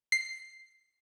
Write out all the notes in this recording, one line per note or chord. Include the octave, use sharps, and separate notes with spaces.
C7